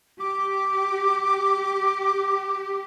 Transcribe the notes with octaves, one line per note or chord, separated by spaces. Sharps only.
G4 D6